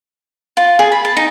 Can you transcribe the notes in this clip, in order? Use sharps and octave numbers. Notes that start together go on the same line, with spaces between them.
F4
G#4
B5
A5
D#4